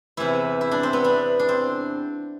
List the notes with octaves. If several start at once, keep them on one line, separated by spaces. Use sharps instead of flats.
E2 C3 E3 E4
E4
D4
C4
B3
D4
D4
C4